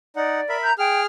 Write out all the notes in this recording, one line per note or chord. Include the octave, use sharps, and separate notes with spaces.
D#4 D5 F#5
A#4 E5 B5
A#5 G6
G#4 G5 F6